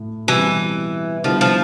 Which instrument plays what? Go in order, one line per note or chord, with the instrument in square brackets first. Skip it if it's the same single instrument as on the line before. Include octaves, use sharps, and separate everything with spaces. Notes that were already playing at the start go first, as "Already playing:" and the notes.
Already playing: [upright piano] A2 A3
[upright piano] B2 G3 C4 [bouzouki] E3
[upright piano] D3 G3 B3 E4 [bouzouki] F3
[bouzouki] F3